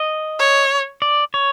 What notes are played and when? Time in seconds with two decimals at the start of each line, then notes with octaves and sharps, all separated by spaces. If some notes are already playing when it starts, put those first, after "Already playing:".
Already playing: D#5
0.39 C#5
1.02 D5
1.34 C#5